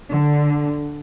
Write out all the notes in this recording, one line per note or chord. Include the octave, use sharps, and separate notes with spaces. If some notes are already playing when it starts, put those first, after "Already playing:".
D3